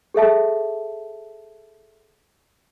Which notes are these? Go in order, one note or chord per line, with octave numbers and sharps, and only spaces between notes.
G#4 A4 E5 A5